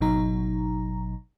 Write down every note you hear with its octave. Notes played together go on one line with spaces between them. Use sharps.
G#1 B2 F#3 D#4 A#5